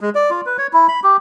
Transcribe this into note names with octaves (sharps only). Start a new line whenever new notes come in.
G#3
D5
F4
B4
C#5
E4
B5
G4